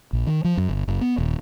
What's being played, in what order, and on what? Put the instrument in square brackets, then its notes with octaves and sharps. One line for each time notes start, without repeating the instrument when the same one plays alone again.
[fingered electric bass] A#1
D#3
F3
F#2
G1
F#1
B3
D#1